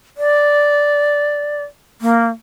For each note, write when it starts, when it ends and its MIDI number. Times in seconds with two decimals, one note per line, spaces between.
0.17 1.62 74
2.01 2.27 58